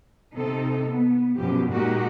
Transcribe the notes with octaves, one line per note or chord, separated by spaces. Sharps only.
C3 C4 D#4 A4
B3
F#2 B2 F3 G4
A#2 G#3 D#4 F#4 G4 A#4